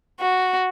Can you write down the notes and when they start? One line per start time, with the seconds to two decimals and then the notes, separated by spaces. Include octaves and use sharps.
0.21 F#4